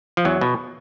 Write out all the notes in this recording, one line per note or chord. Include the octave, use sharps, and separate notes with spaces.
F3
E2 F#3
B2